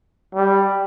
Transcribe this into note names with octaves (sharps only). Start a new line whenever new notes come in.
G3